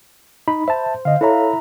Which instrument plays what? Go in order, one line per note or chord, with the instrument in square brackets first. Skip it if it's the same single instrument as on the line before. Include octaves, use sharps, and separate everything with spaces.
[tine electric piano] D#4 [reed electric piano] B5
[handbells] C5 [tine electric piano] E5 A5
[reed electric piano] D3 D#5 [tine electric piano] F5
[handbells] E4 E5 A#5 [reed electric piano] A4 C#5